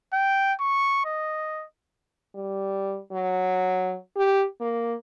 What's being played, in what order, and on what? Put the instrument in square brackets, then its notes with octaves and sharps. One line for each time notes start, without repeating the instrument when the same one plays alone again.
[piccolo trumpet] G5
C#6
D#5
[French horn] G3
F#3
G4
A#3